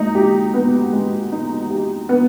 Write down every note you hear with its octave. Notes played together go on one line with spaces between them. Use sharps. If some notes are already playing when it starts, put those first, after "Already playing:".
Already playing: G#3 A#3 D#4
G4
B3
G#3
D#4
G4
B3